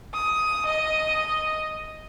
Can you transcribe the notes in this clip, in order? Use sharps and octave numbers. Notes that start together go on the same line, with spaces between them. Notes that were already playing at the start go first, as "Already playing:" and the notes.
D#6
D#5